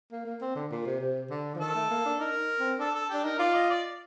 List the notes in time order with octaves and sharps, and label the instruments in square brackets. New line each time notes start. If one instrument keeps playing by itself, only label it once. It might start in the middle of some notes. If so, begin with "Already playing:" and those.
[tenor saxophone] A#3
A#3
C4
D3
A#2
C3
C3
D3
F3
[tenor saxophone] D#3 [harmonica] A4
[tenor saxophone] A3
A#3
D4
[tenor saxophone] D#4 [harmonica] A#4
[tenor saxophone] C4
[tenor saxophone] D4 [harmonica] A4
[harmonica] A4
[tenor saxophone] D4 [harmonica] G4
[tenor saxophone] D#4 [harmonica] A#4
[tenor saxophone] F4 [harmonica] D5
[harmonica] D#5
D5